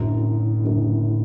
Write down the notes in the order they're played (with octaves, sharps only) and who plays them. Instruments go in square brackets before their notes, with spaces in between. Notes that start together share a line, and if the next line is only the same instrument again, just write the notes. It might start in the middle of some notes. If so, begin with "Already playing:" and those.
Already playing: [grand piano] F#1 F#2 D3 [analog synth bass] A2
[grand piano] F#1 F#2 D3